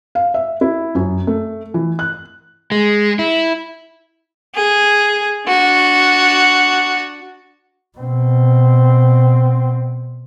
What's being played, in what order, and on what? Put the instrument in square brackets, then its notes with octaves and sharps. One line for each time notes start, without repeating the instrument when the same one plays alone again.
[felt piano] F5
E5
E4
F#2
A3
E3
F#6
[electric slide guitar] G#3
E4
[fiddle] G#4
D4 F#4
[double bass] B2 C4